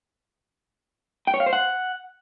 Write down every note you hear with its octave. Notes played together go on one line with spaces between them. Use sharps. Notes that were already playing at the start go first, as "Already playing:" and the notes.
G5
C#5
F5
C5
F#5